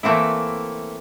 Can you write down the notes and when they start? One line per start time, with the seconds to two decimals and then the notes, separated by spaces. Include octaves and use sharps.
0.03 E3 A3 A#3 C4 E4